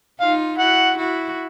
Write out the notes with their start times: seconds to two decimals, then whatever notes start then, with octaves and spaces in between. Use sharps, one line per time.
0.21 D#4 F4 F5
0.59 E4 F#4 F#5
0.97 E4 F#4